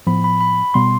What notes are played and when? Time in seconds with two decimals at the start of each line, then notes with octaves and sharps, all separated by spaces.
0.07 A2 F3 B3 B5
0.24 B5
0.41 B5
0.74 B2 G3 B3 C6